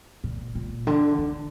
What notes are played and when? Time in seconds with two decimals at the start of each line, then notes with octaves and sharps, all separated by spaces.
0.24 A#2
0.55 A#2
0.87 D3
1.18 D3